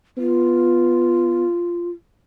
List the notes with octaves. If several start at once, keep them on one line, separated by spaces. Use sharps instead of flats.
B3 F4